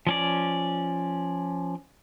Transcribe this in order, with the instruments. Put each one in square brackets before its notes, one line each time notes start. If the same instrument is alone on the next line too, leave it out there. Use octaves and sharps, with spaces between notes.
[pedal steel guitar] F3 C#4 D5